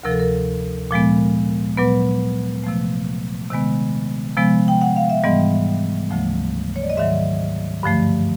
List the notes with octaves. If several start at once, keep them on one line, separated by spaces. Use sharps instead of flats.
D2 C3 F3 A#4
A4
A#4
A#2 F3 G#3 B3
A#2 F#3 B3 B4
C3 F3 A3
C3 D#3 G#3 B3
C3 F3 G#3 B3
G5
F#5
F5
E5
G#2 E3 G3 B3 D#5
D2 C#3 F3 A3
C#5
D5
D#5
G#2 D#3 F#3 E5
G2 D3 F3 A3